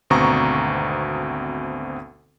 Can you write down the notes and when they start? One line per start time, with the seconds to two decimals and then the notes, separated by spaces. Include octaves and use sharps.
0.10 G#1 D2 B2 C4 A#5 C#6